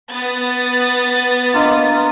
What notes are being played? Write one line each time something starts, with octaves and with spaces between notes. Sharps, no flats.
B3 D#6 A6
A#3 D4 F4 D#5